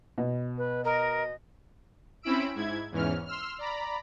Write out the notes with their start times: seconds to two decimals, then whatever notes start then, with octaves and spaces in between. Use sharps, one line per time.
0.18 B2
0.58 B4
0.85 A#4 D#5
2.22 C4 C#4 E4 B5 E6 D7
2.55 G#2 E4 G#6
2.91 E2 G#2 E3 C#4 F6
3.26 C6 E6 F6
3.58 D5 A#5 B5